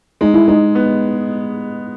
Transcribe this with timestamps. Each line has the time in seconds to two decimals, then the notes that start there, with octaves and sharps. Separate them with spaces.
0.21 G#3 D#4
0.34 E4
0.48 G#3 D#4
0.75 B3